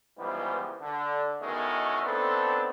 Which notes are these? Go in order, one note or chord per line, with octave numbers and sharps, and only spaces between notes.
C#2 G#2 E3 F3 G3 B3
D3
E2 B2 D#3 G#3 A3 C#4
A3 B3 C4 D4 D#4 A4